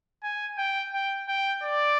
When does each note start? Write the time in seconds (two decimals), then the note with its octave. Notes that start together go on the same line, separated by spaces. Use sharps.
0.23 G#5
0.58 G5
0.93 G5
1.28 G5
1.64 D5